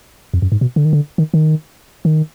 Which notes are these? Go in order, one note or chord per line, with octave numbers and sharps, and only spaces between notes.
F2
F#2
G#2
B2
D3
D#3
D3
D#3
D#3
D#3